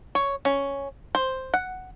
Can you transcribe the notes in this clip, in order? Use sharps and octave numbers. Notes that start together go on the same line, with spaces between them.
C#5
C#4
C5
F#5